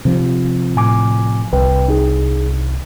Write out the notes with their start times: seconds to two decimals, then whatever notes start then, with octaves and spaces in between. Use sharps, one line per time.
0.05 C3 F3
0.76 A2 G#5 D6
1.53 C2 B4 G5
1.88 D#4 G#4